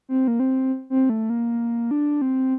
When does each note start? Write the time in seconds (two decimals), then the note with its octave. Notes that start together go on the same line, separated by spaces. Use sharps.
0.09 C4
0.28 A#3
0.40 C4
0.90 C4
1.10 A3
1.30 A#3
1.91 D4
2.22 C4